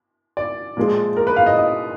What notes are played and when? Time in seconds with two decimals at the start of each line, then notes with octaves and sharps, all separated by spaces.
0.37 D5
0.77 A#2 F3 G#3
1.17 A#4
1.27 B4
1.36 F5
1.46 D#5
1.57 D#5